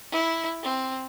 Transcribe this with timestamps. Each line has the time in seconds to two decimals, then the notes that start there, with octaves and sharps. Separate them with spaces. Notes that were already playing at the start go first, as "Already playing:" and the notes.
0.11 E4
0.63 C4